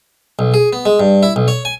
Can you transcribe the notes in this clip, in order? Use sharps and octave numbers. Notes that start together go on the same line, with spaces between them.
B1
G#4
B3
G#3
G2
E4
B1
C#5
G#5